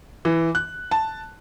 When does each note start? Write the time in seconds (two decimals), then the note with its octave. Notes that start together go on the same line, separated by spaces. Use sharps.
0.25 E3
0.55 F#6
0.91 A5